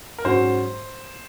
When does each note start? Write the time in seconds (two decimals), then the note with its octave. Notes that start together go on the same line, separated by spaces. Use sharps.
0.18 A#4
0.24 G#2 F#3 C#4 F#4 C5